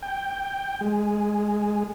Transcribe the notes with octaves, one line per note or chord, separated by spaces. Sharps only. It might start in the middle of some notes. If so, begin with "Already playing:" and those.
G5
G#3